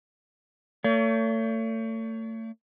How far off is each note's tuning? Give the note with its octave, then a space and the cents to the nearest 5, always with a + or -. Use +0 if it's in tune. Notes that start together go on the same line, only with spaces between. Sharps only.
A3 +35 C#5 +40